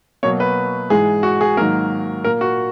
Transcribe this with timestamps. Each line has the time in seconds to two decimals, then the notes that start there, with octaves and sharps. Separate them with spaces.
0.23 B2 F#3 A#3 C#5
0.40 B4
0.90 G#2 E3 G#3 G#4
1.23 F#4
1.41 G#4
1.57 G#2 D#3 F#3 A#3 A#4
2.24 A#2 A#3 A#4
2.41 F#4